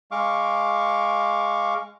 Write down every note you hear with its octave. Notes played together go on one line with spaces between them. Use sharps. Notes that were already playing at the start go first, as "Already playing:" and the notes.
G#3 F5 C#6 D6